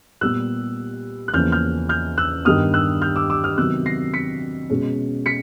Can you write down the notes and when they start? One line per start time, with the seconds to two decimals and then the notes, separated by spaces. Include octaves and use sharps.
0.21 A#2 G3 B3 E6 F#6
1.28 F#6
1.34 E2 C#3 F3 A#3 C#4 F6 G6
1.52 F6 G6
1.89 F6 G6
2.18 E6 F#6
2.45 G2 D#3 G3 B3 D#6 F6
2.74 E6 F#6
3.02 F6 G6
3.16 D6 E6
3.30 D6 E6
3.44 D#6 F6
3.58 C3 D#3 F#3 B3 E6 F#6
3.86 A#6 C7
4.14 B6 C#7
4.70 B2 G#3 C#4
5.26 B6 C#7